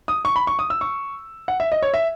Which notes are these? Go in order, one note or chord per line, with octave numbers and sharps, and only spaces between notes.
D#6
C#6
B5
C#6
D#6
E6
C#6
F#5
E5
D#5
C#5
E5